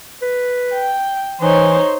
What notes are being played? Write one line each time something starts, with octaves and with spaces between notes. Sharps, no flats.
B4
G5
E3 D#4 C5 C#5